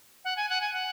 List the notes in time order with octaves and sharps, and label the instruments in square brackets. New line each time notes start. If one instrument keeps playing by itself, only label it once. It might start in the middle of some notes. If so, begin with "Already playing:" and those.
[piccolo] F#5
G#5
F#5
G#5
F#5